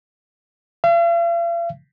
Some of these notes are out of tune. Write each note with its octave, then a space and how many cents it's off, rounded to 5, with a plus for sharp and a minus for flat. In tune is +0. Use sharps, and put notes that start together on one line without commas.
F5 -45